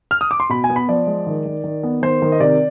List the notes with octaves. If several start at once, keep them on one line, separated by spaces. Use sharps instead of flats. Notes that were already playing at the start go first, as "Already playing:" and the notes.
F6
D#6
D6
C6
B2 B5
G#5
B3
B5
F3 D5
G#3
D#3
D#3
D#3
B3
D#3 C5
D#3
D#5
C3 D5